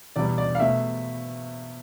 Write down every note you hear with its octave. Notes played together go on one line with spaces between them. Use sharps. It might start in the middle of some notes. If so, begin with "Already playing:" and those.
E2 B2 G3 D5
D5
F5
B2 A3 E5